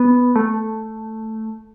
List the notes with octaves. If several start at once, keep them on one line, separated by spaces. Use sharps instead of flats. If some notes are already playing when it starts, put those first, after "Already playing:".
Already playing: B3
A3